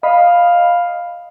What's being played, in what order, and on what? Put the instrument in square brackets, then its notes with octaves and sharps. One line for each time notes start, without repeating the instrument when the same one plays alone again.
[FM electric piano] D#5 B5 [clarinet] F5